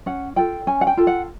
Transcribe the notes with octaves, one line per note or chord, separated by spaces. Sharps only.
C#4 F#5
F4 A4 G5
C#4 G#5
F#5
G5
F4 A4
F#5